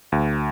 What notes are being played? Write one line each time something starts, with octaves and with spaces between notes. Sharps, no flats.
D2